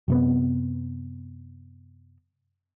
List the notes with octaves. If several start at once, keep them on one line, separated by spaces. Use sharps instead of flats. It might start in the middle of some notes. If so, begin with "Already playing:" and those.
F#2 C3 B3